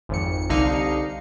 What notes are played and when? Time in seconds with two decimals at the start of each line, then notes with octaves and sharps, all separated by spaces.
0.09 G#1 F2 C#7
0.50 C2 D3 D#4 F5 C#7